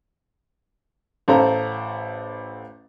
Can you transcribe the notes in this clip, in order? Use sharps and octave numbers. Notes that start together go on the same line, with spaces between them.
A1 A4 C5 F5 A#5